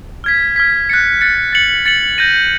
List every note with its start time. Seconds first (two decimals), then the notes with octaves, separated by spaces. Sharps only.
0.24 F6 G#6 B6
0.56 F6 G#6 B6
0.89 F#6 A6 C#7
1.21 F#6 A6 C#7
1.53 A6 C#7 F#7
1.86 A6 C#7 F#7
2.18 G6 A#6 D#7